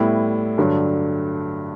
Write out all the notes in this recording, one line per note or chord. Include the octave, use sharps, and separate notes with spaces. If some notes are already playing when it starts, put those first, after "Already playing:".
Already playing: A2 G3 B3 E4
G2 D3 F#3